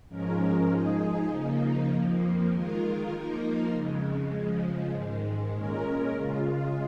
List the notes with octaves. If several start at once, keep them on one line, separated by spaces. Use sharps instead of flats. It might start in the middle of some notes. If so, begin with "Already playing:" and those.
G#2 F3 G#3 C#4 A#4
F3 G#3 D#4 G#4
C#3 F3 A#3 D#4
F2 F3 A#3
D#3 G#3 F4 A#4
F3 A#3 D#4 A#4
F2 C#3 G#3
C#3 F3 G#3
G#2 D#3 G#3
A#2 G#3 C#4 A#4
C#3 G#3 F4